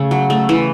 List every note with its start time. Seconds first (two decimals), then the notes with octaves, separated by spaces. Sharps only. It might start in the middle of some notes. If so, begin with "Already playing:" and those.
Already playing: C#3 A3
0.11 F#3
0.30 A3
0.49 E3